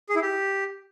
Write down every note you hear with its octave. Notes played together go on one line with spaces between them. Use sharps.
G#4
E4
G4